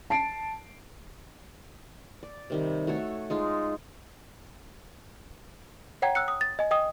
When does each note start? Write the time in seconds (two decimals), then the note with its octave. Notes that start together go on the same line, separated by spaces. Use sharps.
0.10 A5 C7 D7
2.23 D5
2.50 C3 D#3 G3
2.87 A3 F#4 A4 C#5
3.30 G#3 D#4 F4
6.02 C#5 F#5 G5 A#5 G#6
6.15 E6 F#6 C#7
6.28 D#6
6.41 A6
6.59 D#5 G#5
6.71 D#5 G5 D#6